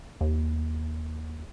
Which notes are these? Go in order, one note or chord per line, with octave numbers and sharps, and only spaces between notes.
D#2